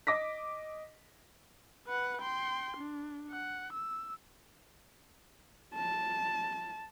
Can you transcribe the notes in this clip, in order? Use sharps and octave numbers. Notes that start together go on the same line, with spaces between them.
D#5 D6 A#6 B6
B4 F#5
G5 C6
D4
F#5
E6
A5